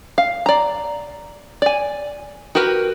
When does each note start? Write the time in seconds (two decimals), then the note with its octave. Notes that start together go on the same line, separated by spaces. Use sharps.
0.18 F5
0.46 D5 A#5
1.62 D5 G#5
2.55 F#4 G4 A#4 B4